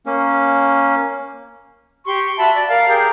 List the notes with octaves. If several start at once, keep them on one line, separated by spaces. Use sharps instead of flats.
A#3 C#4
G4 C6 C#6
F#4 E5 A5 B5
D5
A#4 D5 F5
G4 G#4 A#4 G6